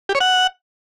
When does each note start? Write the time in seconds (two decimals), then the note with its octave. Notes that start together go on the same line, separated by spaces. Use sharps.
0.09 G4
0.15 C#5
0.21 F#5